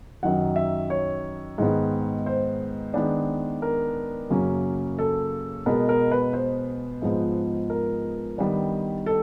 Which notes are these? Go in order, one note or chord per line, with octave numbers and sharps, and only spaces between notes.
F#2 D#3 F#3 F#5
E5
C#5
G#2 D#3 G#3 B3
C5
D#3 G#3 B3 D4
A#4
F#2 C#3 F#3 A#3 C#4
A4
B2 G#3 B3 A#4
A#4
B4
C5
G#2 F3 G#3 B3
A#4
D#3 G3 B3 D4
A4